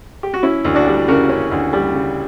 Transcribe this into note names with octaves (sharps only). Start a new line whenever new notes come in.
G4
F#4
C#4 E4
D2
D4 F#4
G3
C#3 F#4 A#4
C#4
D2
G3
C#3